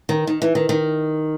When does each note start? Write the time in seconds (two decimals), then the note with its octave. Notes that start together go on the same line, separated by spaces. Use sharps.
0.09 D#3
0.27 D#3
0.42 E3
0.55 D#3
0.69 D#3